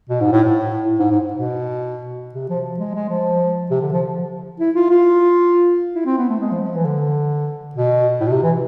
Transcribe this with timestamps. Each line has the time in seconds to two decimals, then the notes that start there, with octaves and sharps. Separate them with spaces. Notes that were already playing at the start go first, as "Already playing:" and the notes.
0.09 B2
0.20 G#2
0.32 A2
0.44 A2
0.99 G#2
1.10 G#2
1.33 B2
2.34 C3
2.49 F3
2.79 G#3
2.95 G#3
3.09 F3
3.70 C3
3.81 D3
3.92 F3
4.60 E4
4.75 F4
4.90 F4
5.95 E4
6.05 C4
6.17 B3
6.29 A3
6.40 G#3
6.52 F3
6.63 F3
6.74 E3
6.85 D3
7.75 B2
8.20 A2
8.27 B2
8.31 C3
8.43 E3